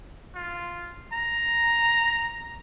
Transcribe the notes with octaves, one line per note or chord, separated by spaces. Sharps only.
F4
A#5